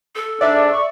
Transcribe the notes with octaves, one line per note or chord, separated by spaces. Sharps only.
A4
G#2 D4 D5 E5
C#6